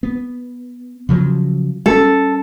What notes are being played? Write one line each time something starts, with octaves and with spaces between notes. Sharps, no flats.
B3
C#3 F3 F#3
G3 B3 C#4 A4